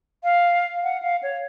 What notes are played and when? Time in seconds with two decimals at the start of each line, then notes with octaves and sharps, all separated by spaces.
0.24 F5
0.83 F#5
1.02 F5
1.23 C#5